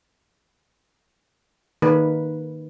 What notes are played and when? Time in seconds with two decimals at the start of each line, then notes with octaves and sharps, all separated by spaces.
1.82 D#3 A#3 B4